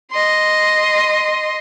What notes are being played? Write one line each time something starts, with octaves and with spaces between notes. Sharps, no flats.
D#5 C6